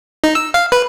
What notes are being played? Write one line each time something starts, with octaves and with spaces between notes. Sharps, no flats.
D#4
E6
F5
B4